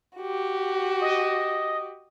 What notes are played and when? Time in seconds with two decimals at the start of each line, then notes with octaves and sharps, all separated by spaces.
0.17 F#4 G4
1.01 D#5